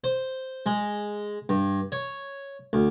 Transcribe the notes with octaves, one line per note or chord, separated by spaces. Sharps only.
C5
G#3
G2
C#5
D2